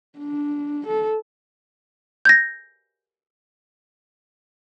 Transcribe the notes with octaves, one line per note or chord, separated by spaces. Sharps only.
D4
A4
G6 G#6 A#6